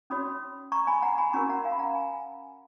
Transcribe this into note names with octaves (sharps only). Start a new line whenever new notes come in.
C#4 F#4 C#5 B5 D#6
A#5 C#6
G#5 B5
F#5 A#5
G#5 B5
C#4 F#4 A#4 A#5 C#6
F#5 A#5
F5 G#5
B5
F#5 A#5
G#5 B5